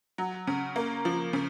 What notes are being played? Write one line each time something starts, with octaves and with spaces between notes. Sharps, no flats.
F#3
C#3
A#3
F3
C#3